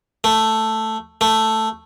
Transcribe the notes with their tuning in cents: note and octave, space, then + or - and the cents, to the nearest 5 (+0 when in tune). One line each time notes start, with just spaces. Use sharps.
A3 +5
A3 +5